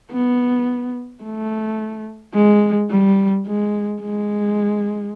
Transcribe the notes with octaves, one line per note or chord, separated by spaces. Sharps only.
B3
A3
G#3
G3
G#3
G#3